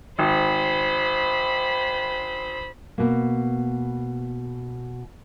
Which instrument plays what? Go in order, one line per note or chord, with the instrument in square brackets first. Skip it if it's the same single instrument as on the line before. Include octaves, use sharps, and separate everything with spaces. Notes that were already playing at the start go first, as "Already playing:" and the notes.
[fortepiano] G#1 [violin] C5 B5
[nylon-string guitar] B2 A#3